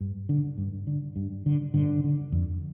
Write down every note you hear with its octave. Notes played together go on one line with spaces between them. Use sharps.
G2
D3
G2
D3
G2
D3
G2 D3
D3
F2